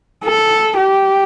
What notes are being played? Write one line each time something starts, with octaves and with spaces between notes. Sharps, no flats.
A4
G4